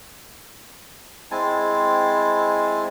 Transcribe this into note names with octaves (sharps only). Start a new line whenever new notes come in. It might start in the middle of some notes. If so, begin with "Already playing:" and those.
G#3 C4 E4 G#5 A5